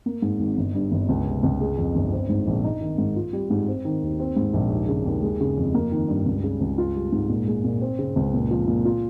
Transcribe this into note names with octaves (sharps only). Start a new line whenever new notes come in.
A#3
G#2
G#1
G1
G2
G1
C#2
C3
C#2
G#3
F2
G1
C4
G#2
A#1
D#4
D#3
G#2
F4
G3
G#2
C4
D#3
D#2
C4
G#2
A#1
D#2
C#3
D#2
G#3
C#3
F2
A#3
D#3
G2
C#2
C#3
C#2
F4
G3
G#2
A#2
G#3
A#2
C4
C#3
C#2
A#2
F3
A#2
F4